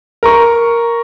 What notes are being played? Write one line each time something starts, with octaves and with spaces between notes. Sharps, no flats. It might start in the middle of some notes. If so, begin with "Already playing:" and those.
A#4 A#5 C#6